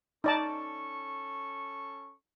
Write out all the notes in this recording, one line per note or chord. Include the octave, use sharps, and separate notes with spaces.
C#4 D#4 A4 D5 A5 C#6